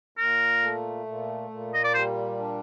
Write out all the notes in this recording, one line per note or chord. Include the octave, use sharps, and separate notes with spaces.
A#2 A#4
A3
A#2
A#2
D#5
D5
G3 C5
D4